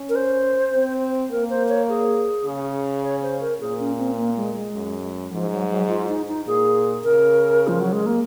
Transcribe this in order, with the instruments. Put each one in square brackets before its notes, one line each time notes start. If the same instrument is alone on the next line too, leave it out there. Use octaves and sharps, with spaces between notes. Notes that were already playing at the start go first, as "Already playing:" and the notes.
Already playing: [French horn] C#4
[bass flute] A#4
C5
[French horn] C4
[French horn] A#3 [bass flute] A#4
[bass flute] C5
C#5
G#4
[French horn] C#3
[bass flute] C#5
C5
A#4
[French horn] A#2 [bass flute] G#4
[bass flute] C#4
C4
A#3
G#3
G#3
[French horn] F#2
[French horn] G#2 [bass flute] F3
[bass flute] F#3
F#3
F4
D#4
D#4
[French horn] A#2 [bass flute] G#4
[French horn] C#3 [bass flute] A#4
[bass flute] F3
F#3
G#3
A#3